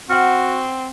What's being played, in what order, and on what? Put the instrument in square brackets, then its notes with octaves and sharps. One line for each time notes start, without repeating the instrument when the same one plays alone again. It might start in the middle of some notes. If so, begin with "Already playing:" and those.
[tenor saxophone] C4 [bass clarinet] F#4 [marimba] F#5 F6